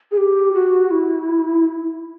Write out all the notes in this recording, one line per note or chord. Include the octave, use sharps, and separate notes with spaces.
G#4
G4
F#4
E4